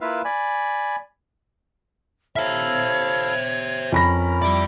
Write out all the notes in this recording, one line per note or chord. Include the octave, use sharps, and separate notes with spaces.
A#3 E4 F4 B4 E5 F5
D5 G#5 B5
E4 A4 C5 C#5 E5 F5
F2 C#4 A#4 B5 A#6
G3 E4 D5 D6